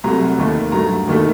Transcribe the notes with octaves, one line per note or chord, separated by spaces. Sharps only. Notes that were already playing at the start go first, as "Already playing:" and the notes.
C2 C3 F#3 A3 A#5
D#2 D#3 A3
G2 F#3 A3 A#5
D#2 D#3 A3